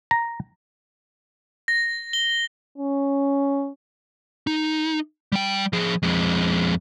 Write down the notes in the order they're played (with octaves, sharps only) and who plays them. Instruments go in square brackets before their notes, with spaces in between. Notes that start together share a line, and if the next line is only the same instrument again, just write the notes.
[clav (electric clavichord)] A#5
[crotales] A#6
G7
[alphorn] C#4
[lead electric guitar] D#4
G3 G5
F3 G#4
F2 G#3